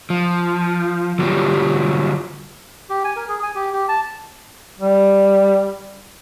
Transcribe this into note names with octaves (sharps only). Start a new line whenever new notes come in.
F3
D3 F#3 G3 A#3 F4 G4
G4
G#5
A#4
G#4
G#5
G4
G4
A5
G3